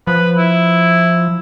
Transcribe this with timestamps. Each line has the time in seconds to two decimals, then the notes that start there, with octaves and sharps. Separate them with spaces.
0.07 F3 B4
0.38 E4